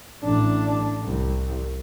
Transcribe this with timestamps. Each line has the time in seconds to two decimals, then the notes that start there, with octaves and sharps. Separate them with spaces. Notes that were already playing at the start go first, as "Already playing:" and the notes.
0.24 A1 D4
1.04 C2